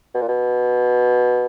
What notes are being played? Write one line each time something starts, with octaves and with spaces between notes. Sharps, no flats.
B2
A#2
B2